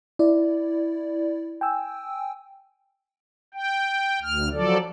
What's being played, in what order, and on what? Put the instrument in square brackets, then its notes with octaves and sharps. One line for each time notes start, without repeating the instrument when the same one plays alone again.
[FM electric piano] E4 D5
G5 G#5 E6
[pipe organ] G5
D2 F6
F3 F#3 A4 D5